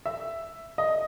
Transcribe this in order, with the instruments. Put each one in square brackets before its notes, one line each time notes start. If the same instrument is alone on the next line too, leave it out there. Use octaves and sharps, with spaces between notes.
[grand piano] E5
D#5